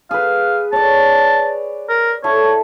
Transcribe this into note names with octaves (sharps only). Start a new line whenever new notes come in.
G#4 B4 F5
C#5 D5 A5
A#4
E4 A4 C#5